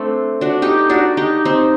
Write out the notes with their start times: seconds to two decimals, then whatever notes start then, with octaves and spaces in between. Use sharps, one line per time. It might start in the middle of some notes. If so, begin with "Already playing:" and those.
Already playing: A3 C4 D4
0.41 D4 F#4
0.62 D#4 G4
0.89 D4 F#4
1.17 D#4 G4
1.45 C4 D#4